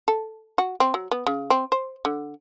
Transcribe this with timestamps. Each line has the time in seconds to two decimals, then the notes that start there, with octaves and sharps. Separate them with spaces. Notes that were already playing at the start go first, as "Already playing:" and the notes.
0.08 A4
0.58 F#4
0.80 C4
0.94 F#3
1.11 B3
1.27 C#3
1.50 C4
1.72 C5
2.05 D3